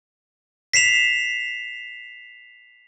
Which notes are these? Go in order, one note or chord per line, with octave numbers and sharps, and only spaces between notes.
B6 C7 E7 F7